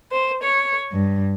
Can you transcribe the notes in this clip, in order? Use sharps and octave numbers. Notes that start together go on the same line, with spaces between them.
C5
C#5
G2